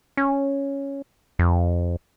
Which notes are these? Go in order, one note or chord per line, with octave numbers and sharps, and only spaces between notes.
C#4
F2